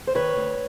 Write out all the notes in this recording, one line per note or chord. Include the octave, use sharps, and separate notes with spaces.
C5
D#3 B4 C#5
D2